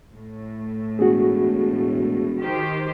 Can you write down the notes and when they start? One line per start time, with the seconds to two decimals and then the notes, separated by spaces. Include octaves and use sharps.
0.14 A2
0.99 E1 F#4 G#4
2.39 D#3 G4 C5